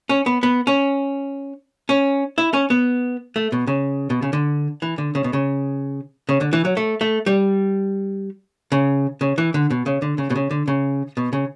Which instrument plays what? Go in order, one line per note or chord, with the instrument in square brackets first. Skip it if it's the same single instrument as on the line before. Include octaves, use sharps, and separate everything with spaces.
[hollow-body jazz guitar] C#4
B3
B3
C#4
C#4
E4
C#4
B3
A3
B2
C#3
B2
C#3
D3
E3
D3
C#3
B2
C#3
C#3
D3
E3
F#3
A3
A3
G3
C#3
C#3
E3
D3
B2
C#3
D3
C#3
B2
C#3
D3
C#3
B2
C#3